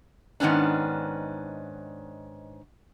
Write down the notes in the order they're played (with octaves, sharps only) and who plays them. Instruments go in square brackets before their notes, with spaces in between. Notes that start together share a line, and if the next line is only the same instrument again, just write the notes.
[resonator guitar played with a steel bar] G#2 D#3 B3 C#4 D4